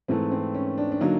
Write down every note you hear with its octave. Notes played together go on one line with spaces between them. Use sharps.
G#2 E3 A3 C4
C4
C#4
D4
D4
D3 F#3 A#3 D#4